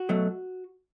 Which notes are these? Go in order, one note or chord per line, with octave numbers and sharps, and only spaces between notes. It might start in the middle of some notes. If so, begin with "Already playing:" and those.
Already playing: F#4
B2 F#3 A3